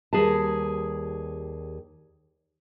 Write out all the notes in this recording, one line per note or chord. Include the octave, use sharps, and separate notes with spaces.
D#2 G3 G#4 B4 A5